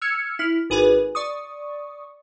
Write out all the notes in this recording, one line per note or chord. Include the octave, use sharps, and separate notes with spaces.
E6 F6 G#6 C#7
E4 F6
G#1 G#4 B4 G#5
D5 C#6 D#6